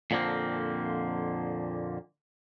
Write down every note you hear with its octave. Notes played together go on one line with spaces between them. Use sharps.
F2 A#2 D3 F3 A#3 C4